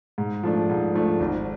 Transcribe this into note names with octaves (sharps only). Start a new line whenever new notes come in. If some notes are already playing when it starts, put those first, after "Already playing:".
G#2
F3 A3 D4
G#2
F3 A3 D4
G#1